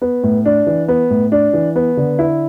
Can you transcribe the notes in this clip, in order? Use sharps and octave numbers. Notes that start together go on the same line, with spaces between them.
B3
A2
D4
E3
B3
A2
D4
E3
B3
D3
E4